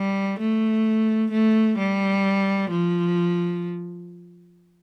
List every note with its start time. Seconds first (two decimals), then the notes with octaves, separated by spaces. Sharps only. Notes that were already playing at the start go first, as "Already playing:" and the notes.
Already playing: G3
0.40 A3
1.32 A3
1.78 G3
2.71 F3